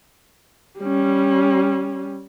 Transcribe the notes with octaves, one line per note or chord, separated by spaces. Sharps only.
G3 C#4